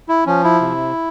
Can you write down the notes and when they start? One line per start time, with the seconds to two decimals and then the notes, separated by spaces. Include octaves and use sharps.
0.09 E4
0.26 F3 C#4
0.44 E4
0.61 C3